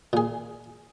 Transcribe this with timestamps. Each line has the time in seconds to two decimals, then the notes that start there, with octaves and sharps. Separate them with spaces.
0.13 A#2 G#4